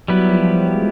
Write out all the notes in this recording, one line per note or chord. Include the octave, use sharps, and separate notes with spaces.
F#3 G3 B3 E4 G4 B4
F3
F#3
G#3